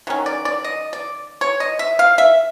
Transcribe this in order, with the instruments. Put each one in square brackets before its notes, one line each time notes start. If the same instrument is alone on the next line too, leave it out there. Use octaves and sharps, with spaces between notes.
[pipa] D#3 F#3 C#4
D5
D5
D#5
D5
C#5
D#5
E5
F5
E5